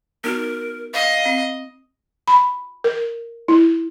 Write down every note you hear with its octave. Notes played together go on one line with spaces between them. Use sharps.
B3 D#4 F#4 A#4
D#5 F5
C4
B5
A#4
E4